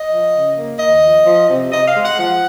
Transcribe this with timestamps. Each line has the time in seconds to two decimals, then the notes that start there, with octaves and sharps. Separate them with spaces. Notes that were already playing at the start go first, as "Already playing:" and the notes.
Already playing: D#5
0.10 F3
0.32 C#3
0.56 A#3
0.79 D#2 D#5
1.03 F3
1.26 F3
1.50 C3
1.72 C3 D#5
1.88 F5
1.96 G#3
2.04 F#5
2.19 F3 F#5